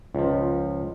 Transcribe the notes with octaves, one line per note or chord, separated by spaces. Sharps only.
C#2 F3